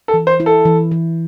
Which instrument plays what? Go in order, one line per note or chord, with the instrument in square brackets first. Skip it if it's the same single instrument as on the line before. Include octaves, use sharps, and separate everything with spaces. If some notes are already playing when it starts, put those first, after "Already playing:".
[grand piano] A4
[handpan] E3
[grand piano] C5
[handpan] E4
[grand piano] A4
[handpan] E3
E3